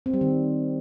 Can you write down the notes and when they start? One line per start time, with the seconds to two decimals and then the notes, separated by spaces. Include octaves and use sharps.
0.06 C4
0.14 G3
0.21 D#3